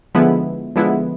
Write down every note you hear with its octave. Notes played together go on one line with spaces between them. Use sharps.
D3 F3 G#3 B3 E4
D3 F3 G#3 B3 E4